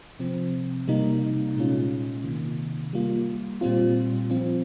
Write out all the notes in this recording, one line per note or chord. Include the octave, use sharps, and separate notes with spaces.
C3 F3 C4
C3 G3 A#3 D#4
A#2 G#3 C#4 F4
C3 D#3 A#3
G3 A#3 F4
A#2 G3 C4 F4
F3 C4 F4